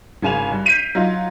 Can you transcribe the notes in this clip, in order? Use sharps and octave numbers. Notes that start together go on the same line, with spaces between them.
G#1 C#3 G#5 E7 F7
G2
G6 B6 C7 D7 D#7 F7
F#3 D#4 F4